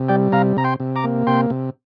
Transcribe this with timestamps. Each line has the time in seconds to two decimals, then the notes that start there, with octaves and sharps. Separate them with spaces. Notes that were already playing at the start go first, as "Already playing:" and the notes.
Already playing: C3
0.09 G3 D5 G5
0.32 C3 F5 A#5
0.57 C3 A#5
0.64 G5 C6
0.80 C3
0.96 A#5 D6
1.04 A#3
1.27 C3 G5 C6
1.50 C3